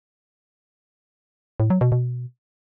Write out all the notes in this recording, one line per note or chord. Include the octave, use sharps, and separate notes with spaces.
A2
F#3
B2
B2